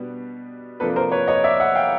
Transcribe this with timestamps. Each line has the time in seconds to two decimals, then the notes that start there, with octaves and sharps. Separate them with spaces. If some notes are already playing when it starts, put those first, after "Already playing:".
Already playing: B2 G3 B3 D4
0.80 C3 F3 A#3 D4 A4 B4
0.96 A#4 C5
1.12 B4 C#5
1.27 C#5 D#5
1.44 D5 E5
1.60 E5 F#5
1.75 F5 G5